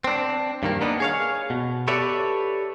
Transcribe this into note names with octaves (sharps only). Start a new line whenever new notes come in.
C4 D4
G2 D#3 A#3
A#3 B3 D4 D#4
G#4 C#5 F5
B2
G4 A4 B4 C#5 D5 E5